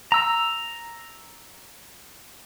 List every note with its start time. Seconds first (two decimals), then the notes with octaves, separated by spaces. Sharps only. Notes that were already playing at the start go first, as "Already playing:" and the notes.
0.12 A#5 E6